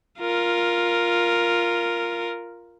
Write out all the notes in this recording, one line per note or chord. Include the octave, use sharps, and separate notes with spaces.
F4 A#4